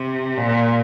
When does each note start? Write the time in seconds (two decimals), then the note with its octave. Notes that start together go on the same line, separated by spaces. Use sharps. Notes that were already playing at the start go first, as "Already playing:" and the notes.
Already playing: C3
0.37 A#2